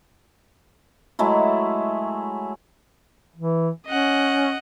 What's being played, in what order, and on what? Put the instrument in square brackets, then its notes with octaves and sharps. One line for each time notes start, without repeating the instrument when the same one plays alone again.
[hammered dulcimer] F#3 G#3 A3 E4
[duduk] E3
[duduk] C#4 [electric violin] D#5 F#5